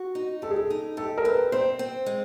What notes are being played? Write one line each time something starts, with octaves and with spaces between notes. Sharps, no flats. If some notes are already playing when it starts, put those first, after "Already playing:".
Already playing: F#4
D#4
G4 A4
G#4
A4
D#4
G4 A4
A#4
C4 B4
C4 C5
C4
G#3